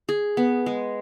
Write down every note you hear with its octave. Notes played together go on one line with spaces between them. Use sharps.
G#4
B3
G#3